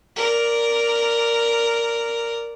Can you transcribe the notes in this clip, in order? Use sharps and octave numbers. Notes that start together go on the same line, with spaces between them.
A#4 D5